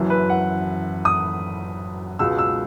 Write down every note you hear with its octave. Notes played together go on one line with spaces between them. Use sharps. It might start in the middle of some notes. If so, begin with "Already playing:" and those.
Already playing: F#1 F#2 E3
B4
F#5
D#6
C#2 B2 G#3 E6
E6